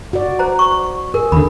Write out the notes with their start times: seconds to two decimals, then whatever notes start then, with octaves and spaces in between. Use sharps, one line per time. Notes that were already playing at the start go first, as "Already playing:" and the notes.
0.13 F#4 D5
0.39 C5 A#5
0.59 C#6
1.14 G#4 A#4
1.32 D#2 D3 B5